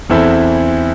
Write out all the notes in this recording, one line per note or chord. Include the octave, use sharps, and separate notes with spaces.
E2 E3 C4 E4 A4